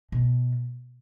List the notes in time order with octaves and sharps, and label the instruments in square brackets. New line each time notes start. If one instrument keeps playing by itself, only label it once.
[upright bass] B2